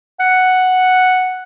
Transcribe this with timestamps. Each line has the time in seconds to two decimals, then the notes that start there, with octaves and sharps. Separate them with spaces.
0.20 F#5